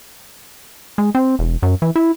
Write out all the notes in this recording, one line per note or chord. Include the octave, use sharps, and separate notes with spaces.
G#3
C4
E1
F#2
E3
E4